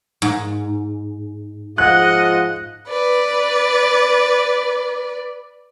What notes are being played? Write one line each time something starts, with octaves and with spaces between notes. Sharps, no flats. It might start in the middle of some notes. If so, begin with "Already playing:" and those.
G#2
F3 G#3 F4 D#5 F#5 F#6
B4 D5